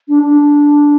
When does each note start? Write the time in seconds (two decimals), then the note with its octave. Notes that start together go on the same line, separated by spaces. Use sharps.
0.08 D4
0.23 D4